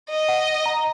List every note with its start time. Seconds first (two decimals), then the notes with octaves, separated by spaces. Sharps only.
0.10 D#5
0.29 F#5
0.66 A#5